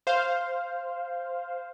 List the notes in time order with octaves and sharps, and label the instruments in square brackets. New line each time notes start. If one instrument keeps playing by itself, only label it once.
[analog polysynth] C5 F5